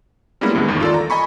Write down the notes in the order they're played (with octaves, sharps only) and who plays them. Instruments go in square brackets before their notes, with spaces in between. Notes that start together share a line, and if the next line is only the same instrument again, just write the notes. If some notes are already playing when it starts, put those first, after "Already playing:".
[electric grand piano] G3 G#3 A#3 B3 C#4 E4
D2 G2 E3 G#3 B3
G#1 E2 D#3
F4 A4 D5
A#5
D#5 G#5 B5 C#6